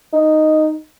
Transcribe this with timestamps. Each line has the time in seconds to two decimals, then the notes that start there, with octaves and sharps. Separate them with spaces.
0.13 D#4